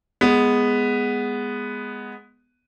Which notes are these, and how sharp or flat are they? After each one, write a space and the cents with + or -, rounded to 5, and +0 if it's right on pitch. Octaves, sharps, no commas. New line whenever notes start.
G#3 +0 B3 +0